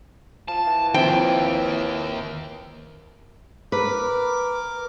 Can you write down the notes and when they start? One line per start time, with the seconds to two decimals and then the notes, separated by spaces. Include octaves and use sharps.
0.48 F3 A5
0.67 E3
0.94 D#2 F3 C4 G5
3.72 A#4 B4 D6